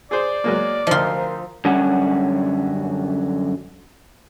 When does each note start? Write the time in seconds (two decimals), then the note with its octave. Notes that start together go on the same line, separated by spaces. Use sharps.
0.11 G#4 C5 D5
0.44 F#3 G#3 A#3
0.87 D2 F3 D#4 F4 A#4 C5
1.65 F#2 D3 F#3 G3 C#4 F#5